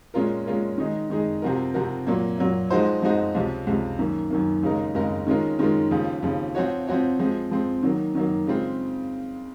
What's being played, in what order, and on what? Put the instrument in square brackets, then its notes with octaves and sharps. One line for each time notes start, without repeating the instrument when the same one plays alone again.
[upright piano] A#2 G#3 C#4 F4 A#4
A#2 G#3 C#4 F4 A#4
D#3 G#3 D#4 G#4
D#3 G#3 D#4 G#4
C3 F3 C4 F#4 A#4
C3 F3 C4 F#4 A#4
A#2 F#3 A#3
A#2 F#3 A#3
F3 G#3 D#4 F#4 C5
F3 G#3 D#4 F#4 C5
C#2 C3 F3
C#2 C3 F3
F#2 D#3 A#3
F#2 D#3 A#3
D#2 C#3 G#3 D#4 A#4
D#2 C#3 G#3 D#4 A#4
D#3 G#3 C#4 F4 A#4
D#3 G#3 C#4 F4 A#4
D#2 C#3 F3
D#2 C#3 F3
F3 C4 F#4 C#5
F3 C4 F#4 C#5
F3 G#3 C4
F3 G#3 C4
D#3 F#3 A#3
D#3 F#3 A#3
C#3 G#3 C4 F4